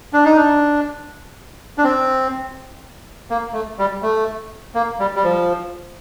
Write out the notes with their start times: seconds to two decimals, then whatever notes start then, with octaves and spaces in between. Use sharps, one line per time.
0.13 D4
0.25 D#4
0.36 D4
1.78 D4
1.84 C4
3.30 A#3
3.53 A3
3.78 G3
4.02 A3
4.75 A#3
4.99 G3
5.15 G3
5.24 F3